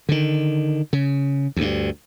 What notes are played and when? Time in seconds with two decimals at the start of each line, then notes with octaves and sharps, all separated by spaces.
0.09 D3 D#3
0.93 C#3
1.56 D2 G2